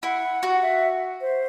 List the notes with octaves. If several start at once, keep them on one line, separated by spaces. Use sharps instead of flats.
E4 F#5
F#4
E5
C5